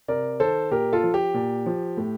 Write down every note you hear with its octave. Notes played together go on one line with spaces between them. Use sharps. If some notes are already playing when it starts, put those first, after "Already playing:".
C3 A#4 D5
D#3 A4 C5
A#2 G4 A#4
F4 A4
F3
G4
A#2
F3
A2